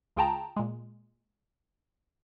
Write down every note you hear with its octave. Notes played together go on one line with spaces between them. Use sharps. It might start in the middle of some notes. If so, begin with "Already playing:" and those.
C#2 F4 G#4 G5 A5 A#5
A#2 G#3